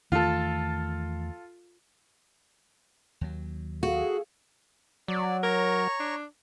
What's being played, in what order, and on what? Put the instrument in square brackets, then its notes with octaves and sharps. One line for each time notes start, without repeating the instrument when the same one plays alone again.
[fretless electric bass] E2 D#3 A3 [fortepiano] F4 A4
[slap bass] D#2 F#3
[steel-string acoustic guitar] F#4 [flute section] G#4 A4 F5
[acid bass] F#3 [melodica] D5
[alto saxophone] A#4 [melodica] C#5 A#5 C#6
[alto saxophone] D4